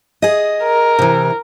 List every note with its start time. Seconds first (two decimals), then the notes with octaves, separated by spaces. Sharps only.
0.22 G#4 D#5
0.63 A#4
0.99 C3 E3